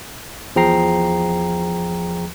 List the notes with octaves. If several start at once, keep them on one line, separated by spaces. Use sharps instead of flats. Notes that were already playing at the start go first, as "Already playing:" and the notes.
E2 F3 G#4 G5 A#5 C7